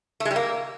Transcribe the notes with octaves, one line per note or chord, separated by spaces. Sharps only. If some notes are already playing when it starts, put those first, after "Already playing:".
A3
G#3
G3
A#3